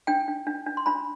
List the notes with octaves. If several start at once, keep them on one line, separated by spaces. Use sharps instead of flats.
D4 G5
D4
D4
D4
C6
D4 B5